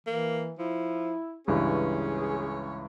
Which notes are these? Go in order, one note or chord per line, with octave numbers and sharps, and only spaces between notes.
E3 A#3
F3 E4
C#2 G2 E3 C#4 G#4